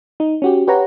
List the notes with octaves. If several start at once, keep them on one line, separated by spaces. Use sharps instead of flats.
D#4
C#4 F#4 G4
G4 B4 C#5 F#5 A#5